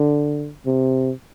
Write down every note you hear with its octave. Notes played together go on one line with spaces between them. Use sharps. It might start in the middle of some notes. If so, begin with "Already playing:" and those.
Already playing: D3
C3